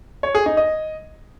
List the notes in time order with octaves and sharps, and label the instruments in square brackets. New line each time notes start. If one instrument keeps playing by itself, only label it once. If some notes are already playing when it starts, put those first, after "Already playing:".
[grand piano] C#5
G#4
D#4
D#5